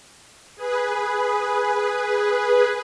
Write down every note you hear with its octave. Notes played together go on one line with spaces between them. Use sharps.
G#4 B4